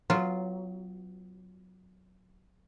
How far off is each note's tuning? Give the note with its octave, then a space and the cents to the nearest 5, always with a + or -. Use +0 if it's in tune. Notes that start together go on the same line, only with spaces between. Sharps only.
F#3 +0 B3 +30 F4 -5